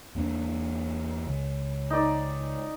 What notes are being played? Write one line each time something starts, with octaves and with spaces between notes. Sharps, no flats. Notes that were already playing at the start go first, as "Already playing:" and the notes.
E2 A#3 D4
C#2
D#4 D5